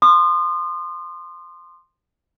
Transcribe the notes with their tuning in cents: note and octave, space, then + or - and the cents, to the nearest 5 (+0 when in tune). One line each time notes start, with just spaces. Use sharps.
C6 +0 D#6 -35